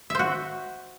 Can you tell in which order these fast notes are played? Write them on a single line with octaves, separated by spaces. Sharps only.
E5 C5 F#4